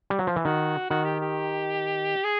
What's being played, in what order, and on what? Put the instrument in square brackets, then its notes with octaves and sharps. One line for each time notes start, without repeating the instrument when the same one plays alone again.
[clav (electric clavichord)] G3
F#3
F3
E3
[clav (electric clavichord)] D#3 [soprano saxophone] F#4
[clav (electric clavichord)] D#3 [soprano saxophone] F#4
[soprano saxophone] G4
G4
G#4